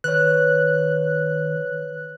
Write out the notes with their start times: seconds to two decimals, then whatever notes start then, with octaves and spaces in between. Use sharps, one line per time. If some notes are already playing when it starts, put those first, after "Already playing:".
0.04 D#3 B4 C#5 F#6